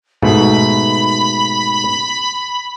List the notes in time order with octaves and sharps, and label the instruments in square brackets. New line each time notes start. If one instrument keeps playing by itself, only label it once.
[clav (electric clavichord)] G#2 B2 A3 [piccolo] B5